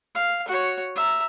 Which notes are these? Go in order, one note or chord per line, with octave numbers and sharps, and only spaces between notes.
F5
F#4 C#5
E5 A#5